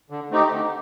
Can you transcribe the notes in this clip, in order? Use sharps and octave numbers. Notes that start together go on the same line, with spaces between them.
D3
A3 C4 D#4 G4
D3